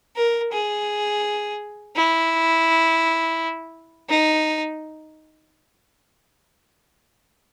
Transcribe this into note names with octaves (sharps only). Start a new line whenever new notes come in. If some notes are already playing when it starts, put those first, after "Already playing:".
A#4
G#4
E4
D#4